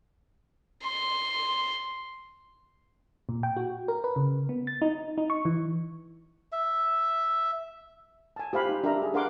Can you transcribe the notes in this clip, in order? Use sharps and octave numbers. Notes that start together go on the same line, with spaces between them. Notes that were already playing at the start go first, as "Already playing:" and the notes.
C6
A#2
G5
F#4
A#4
B4
C#3
B3
A6
D#4
D#4
C#6
E3
E5
G#5 A5
G4 C5 F5 B5
D#4
D4 G4 A#4 E5 A#5
G#4
D4 A#4 F5 F#5 C6 D6